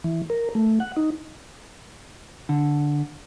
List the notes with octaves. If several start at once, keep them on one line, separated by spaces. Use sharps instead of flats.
E3
A#4
A3
F#5
D#4
D3